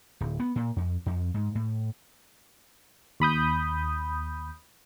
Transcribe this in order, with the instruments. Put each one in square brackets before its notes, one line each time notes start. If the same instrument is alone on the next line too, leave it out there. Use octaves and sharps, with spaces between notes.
[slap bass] D1
B3
A#2
F2
F2
G#2
A2
[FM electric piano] D#2 B5 D#6 G6